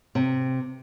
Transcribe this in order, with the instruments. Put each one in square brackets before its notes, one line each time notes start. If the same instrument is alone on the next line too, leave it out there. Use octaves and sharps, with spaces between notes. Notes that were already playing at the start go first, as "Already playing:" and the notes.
[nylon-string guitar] C3